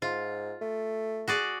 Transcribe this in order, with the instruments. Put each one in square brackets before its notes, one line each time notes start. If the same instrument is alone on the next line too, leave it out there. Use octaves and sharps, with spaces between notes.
[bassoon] G#2 [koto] F4
[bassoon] A3
[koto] F#4 G#4 D5